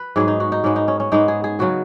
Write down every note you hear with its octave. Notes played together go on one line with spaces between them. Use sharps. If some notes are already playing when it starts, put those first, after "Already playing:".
Already playing: B4
G#2 F#3 B3 G#4
D#4
F#4
D#4
G#2 G#3 B3 C#4
D#4
C#4
C#4
G#2 G#3 B3 D#4
G#4
G#4
C#3 F#3 B3 F#4